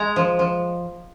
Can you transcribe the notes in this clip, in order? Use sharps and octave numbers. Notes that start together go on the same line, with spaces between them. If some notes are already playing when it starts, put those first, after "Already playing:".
Already playing: G#3 G#5 A#5
F3
F3